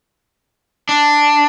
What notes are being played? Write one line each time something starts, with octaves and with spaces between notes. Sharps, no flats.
D4